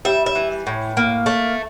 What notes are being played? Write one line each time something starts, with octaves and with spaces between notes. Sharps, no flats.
G3 E5
E5
E3
A2
A#3
A3